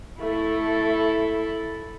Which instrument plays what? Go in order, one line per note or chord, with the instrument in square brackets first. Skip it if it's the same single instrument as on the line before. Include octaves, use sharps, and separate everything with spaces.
[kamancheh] A3 [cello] E4 A4